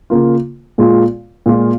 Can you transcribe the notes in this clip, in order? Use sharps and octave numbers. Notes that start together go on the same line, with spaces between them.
C#3 A#3 F4
A#2 G#3 F4
A#2 G#3 F4